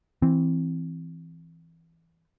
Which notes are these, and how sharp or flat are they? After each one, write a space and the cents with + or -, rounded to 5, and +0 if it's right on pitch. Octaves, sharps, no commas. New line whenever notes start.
E3 +0 C4 +0